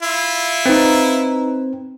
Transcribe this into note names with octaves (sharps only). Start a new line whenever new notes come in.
E4 F4
C4 D#4 B4